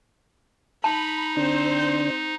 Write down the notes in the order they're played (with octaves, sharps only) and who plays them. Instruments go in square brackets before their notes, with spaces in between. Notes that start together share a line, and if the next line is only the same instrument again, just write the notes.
[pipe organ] D#4 [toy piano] A5 [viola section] B5
[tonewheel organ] D3 D4 [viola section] C4 C5